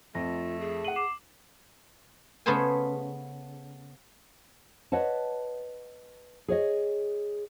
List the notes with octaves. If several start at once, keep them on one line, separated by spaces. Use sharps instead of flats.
F2 A3 F4 A#6
G#4
F#5 D#7 F#7
D6 C7 E7
C#3 A3 B3 B4 C5 G#5
B4 C#5 D#5 F#5 A5
G#4 C#5 D#5